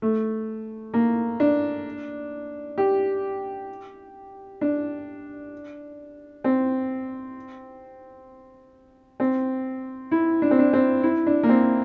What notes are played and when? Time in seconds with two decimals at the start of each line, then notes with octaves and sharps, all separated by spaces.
0.02 A3
0.94 A#3
1.40 D4
2.78 G4
4.61 D4
6.44 C4
9.20 C4
10.11 E4
10.42 D4
10.51 C4
10.59 D4
10.73 C4
11.03 E4
11.27 D4
11.43 A#3
11.49 C4